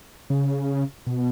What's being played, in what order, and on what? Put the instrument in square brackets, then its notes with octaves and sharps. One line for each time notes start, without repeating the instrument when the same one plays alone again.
[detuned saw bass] C#3
B2